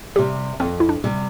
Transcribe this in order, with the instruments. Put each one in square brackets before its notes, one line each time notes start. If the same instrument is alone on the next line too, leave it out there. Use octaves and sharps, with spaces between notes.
[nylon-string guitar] C3 G3 [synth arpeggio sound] G4
[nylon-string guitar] F2 [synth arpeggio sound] C4
[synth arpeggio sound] E4
D4
[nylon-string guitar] C3 G3